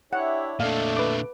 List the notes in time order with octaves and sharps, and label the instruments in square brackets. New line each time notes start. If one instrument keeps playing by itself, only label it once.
[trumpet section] D4 G4 E5 [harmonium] E4 C#5 [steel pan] F#5
[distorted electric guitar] A#2 D3 [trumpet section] A3 [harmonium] D5 D#5 [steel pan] F5
[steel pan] B4 D6